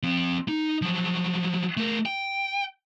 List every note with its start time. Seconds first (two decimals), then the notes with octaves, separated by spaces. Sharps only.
0.03 F3 C4
0.48 D#4
0.82 F3 F#3
1.77 A3 A#4
2.06 G5